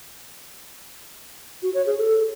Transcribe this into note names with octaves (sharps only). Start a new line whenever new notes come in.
F#4
C#5
G#4
A4